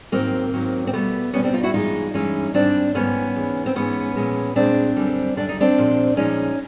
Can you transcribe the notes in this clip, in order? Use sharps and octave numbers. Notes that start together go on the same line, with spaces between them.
G#2 D#3 F#3 A#3 C4
G#2 D#3 F#3
C4
B2 G3 A3 B3
B2 G3 B3 C#4
C4 D4
D#4 F4
E4 F#4
G2 E3 G#3 D#4 F4
G2 E3 G#3 C#4 D#4
G#2 D#3 G3 C4 D4
G#2 D#3 G3 B3 C#4
G#2 E3 G#3
C4
G#2 E3 G#3 B3 C#4
A#2 F3 G#3
A#2 F3 G#3 C4 D4
F#2 D3 G3
F#2 D3 G3 D4
D#4
C4 D4
A#2 F3 G#3
A#2 F3 G#3 C#4 D#4